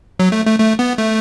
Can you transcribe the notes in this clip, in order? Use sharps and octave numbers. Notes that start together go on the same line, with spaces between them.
F#3
A3
A3
A3
B3
A3